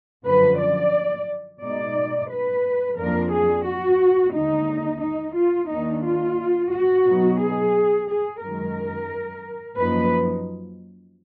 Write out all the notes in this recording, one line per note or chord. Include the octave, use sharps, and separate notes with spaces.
F#2 D3 F3 B4
D5
B2 G#3 D#4 D5
B4
F2 F3 A#3 D4 A#4
G#4
F#4
D#2 D3 G#3 D#4
D#4
F4
D#2 D#3 A#3 D4 D#4
F4
F#4
B2 F#3 B3 D#4
G#4
G#4
F#2 D#3 G#3 A#4
F#2 F3 A#3 D#4 B4